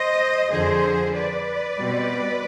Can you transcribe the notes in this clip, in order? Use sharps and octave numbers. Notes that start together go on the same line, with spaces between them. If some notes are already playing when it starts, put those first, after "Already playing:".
Already playing: C5 D#5
F2 D3 F3 G#4 C5
B4 D5
B2 G3 C4